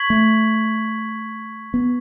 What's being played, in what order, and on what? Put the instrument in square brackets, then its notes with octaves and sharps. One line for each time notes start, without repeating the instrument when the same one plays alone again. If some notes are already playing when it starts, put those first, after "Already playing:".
Already playing: [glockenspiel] C#6 G#6 B6 F#7
[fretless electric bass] A3
B3